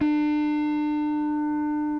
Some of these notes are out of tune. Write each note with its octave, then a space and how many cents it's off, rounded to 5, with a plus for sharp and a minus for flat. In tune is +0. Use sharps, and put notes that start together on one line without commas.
D4 +35